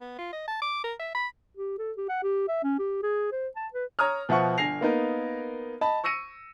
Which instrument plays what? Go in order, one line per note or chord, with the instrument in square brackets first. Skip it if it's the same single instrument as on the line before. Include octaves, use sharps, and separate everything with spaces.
[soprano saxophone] B3
F4
D#5
A5
D6
A#4
E5
B5
[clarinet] G4
A4
G4
F#5
G4
E5
C#4
G4
G#4
C5
A5
B4
[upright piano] C#5 A#5 D#6 F6
B2 F3 E5 F#5 C#6
G1 D3 G#5 A#6 C7 F7
A#3 B3 D#4 A#4
D#5 A5 B5
C#6 E6 A#6 C#7 D#7